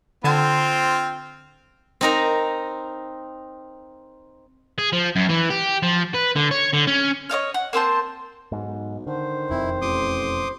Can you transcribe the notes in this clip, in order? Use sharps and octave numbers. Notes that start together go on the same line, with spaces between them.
D3 C4 F4 A5 G#6
C4 D#4 A#4
G#4
F3
F#2
E3
G4
F3
B4
D3
C#5
D3
C#4
C#5 D#5 F5 F6
F#5
A#3 C4 C5 A5
B1 G#2
D3 D#3 C5
E1 F2 C4 E4
A1 C6 D6 D#6